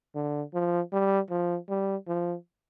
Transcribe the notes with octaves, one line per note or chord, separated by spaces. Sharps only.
D3
F3
G3
F3
G3
F3